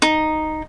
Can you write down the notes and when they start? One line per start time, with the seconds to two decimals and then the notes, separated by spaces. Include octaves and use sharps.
0.02 D#4